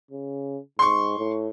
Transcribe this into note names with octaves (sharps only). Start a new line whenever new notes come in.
C#3
G#2 C6 C#6
A2